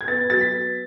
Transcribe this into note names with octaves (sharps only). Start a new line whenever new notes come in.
G#6
B3 A6
F#3 A6
B6
B3